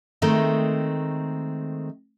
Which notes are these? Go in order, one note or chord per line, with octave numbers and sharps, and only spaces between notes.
D#3 G#3 A3 C4